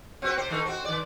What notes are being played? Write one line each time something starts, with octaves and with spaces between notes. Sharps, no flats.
C4 F#4 B4
C3 C5
D#3 A3 D#4
C4 F#4
D#3 D5